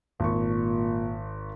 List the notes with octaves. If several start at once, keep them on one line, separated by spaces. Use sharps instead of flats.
G#1 A#2 C#6